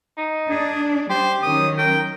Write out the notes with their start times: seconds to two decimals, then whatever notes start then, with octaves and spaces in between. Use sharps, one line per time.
0.17 D#4
0.50 D4 G#4
1.10 G3 G4 C5
1.43 D#3 F#3 C#4 D#6
1.78 A#4 G5